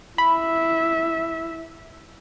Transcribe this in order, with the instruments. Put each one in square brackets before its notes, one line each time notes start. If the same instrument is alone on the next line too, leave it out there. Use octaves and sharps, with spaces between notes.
[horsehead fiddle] E4 E5 [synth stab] B5